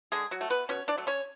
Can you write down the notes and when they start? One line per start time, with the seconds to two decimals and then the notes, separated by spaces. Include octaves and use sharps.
0.12 D3 G#3 G#4
0.31 F#3 F#4
0.41 A3
0.50 B3 B4
0.69 B2 C#4 C#5
0.88 D4 D5
0.98 F#3 A3
1.07 C#4 C#5